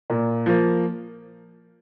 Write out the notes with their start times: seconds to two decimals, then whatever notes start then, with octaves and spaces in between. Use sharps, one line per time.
0.10 A#2
0.46 F3 A#3